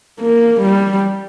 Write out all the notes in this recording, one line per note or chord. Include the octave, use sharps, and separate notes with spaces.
A#3
G3